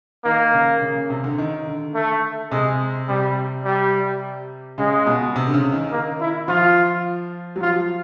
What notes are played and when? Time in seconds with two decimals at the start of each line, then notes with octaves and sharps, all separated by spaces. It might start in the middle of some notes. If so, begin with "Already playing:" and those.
0.24 D#3 A#3
0.54 C#3
0.81 C#3
0.96 C#3
1.10 C3
1.24 D3
1.38 D#3
1.66 D3
1.95 A3
2.51 C3 G#3
3.08 C3 G3
3.65 G3
4.78 C#3 G#3
5.07 B2
5.36 C3
5.47 D3
5.54 C#3
5.72 D#3
5.92 A#3
6.21 E4
6.48 F3 F4
7.56 F#3
7.61 F3 F4